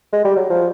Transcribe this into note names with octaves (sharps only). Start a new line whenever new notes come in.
G#3
G3
F#3
F3